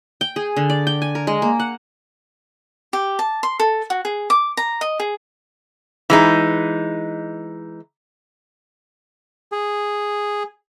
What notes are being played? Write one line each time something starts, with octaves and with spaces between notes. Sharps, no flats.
G5
G#4
D3
D5
G5
G#5
A#4
G#3
A#3
F#5
G4
A5
C6
A4
F#4
G#4
D6
A#5
D#5
G#4
E3 G#3 D#4
G#4